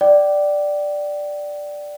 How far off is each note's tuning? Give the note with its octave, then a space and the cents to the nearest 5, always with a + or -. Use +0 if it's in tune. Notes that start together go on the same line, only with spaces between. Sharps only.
D5 +0 G5 -30